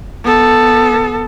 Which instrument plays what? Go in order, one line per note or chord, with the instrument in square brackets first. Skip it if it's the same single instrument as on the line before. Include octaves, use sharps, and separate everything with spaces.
[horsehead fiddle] B3 A4